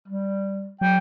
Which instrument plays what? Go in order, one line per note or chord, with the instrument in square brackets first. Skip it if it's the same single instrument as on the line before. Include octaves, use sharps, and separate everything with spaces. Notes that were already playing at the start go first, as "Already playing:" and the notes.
[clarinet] G3
[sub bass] F#3 [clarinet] G5